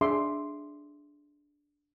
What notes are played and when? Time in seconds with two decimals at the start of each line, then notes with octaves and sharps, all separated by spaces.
0.01 D4 G#4 E5 C6 D6